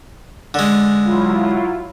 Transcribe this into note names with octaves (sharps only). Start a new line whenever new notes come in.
D3 G#3
F#3 E4 F4